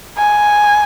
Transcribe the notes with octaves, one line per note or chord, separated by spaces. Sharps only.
G#5